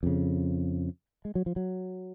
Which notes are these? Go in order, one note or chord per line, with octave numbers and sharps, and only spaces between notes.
F2 C#3
G#3
F#3
F3
F#3